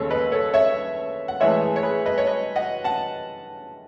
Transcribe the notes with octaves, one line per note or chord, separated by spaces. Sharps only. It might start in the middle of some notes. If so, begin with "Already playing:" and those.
Already playing: D#2 C#3 G#3 A4 C#5
B4 D#5
A4 C#5
C#5 E5
F#5
A2 E3 G#3 C#5 E5
G#4
C#5
G#4 B4
B4 D#5
C#5
B4 D#5
D#5 F#5
F#5 A5